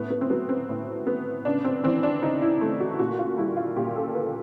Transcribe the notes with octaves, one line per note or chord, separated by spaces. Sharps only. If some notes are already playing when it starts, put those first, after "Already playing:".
Already playing: A2 B3
B3
C4
F#3 B3
C4
A2
B3
C#3 D4
C4
E3 C4
D4
C#3 D#4
E4
A3
F#4
A#2 F#4
F4
G3 E4
F4
A#2 G4
A4
A#3 B4